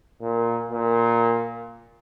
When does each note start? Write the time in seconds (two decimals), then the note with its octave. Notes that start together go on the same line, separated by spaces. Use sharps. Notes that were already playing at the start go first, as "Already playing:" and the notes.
0.22 A#2
0.71 A#2